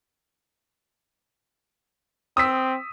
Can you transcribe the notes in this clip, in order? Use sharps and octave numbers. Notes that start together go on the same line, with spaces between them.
C4 D#6 E6 B6